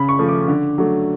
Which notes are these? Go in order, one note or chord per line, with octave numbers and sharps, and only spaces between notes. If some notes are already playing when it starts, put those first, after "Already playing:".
Already playing: C#3 B5
C#6
F3 A3
D6
D3
F#3 A3